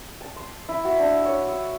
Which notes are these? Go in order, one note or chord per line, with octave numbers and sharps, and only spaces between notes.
A5
C6
E4
F#4
D4
C#5
E6